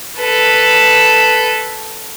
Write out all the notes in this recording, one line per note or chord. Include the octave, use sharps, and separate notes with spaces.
A4 B4